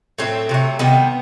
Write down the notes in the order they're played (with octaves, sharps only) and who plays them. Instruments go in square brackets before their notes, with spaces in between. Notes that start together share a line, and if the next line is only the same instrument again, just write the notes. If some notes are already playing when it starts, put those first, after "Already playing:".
[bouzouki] A2 F#3 A3 C4
C3 F#3 A3
C3 D#3 G3 B3